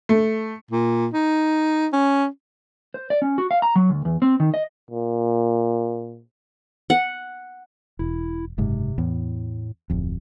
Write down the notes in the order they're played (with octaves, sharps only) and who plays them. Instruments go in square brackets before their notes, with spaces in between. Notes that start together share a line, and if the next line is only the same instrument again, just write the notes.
[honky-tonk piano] A3
[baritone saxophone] A#2
D#4
C#4
[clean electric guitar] C5
D5
C#4
F#4
F5
A#5
F#3
D2
E2
C4
D#3
D#5
[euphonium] A#2
[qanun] F#5
[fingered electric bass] E1 [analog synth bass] E4
[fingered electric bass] F#1 G#2 [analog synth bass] C3
[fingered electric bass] E2 [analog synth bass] A2
[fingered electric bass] D1 F2